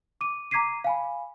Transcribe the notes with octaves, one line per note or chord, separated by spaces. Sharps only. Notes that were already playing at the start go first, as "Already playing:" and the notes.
D6 D#7
A#5 D6 G#6 B6 C7 D#7
F5 G#5 B5